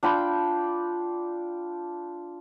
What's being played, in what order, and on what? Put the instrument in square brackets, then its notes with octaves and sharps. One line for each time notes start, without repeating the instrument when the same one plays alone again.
[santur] D4 F4 G5 B5